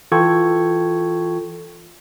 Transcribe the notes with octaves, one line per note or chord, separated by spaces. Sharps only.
E3 F4 A4 G5 C#6 G#6